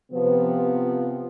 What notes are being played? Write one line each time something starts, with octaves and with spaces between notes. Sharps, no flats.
C3 F3 B3